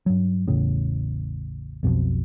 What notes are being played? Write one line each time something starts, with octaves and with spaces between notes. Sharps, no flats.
G2 F#3
A1 E2 A2 C#3
B1 F2 B2 F3